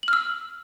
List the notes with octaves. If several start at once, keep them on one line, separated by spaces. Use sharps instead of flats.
E6 F6 F#7